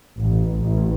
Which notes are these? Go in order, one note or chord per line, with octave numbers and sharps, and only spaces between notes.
A1
A1